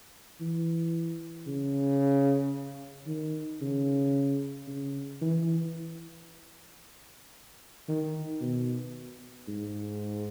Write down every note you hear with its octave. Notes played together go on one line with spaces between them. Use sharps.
E3
C#3
D#3
C#3
C#3
E3
D#3
B2
G#2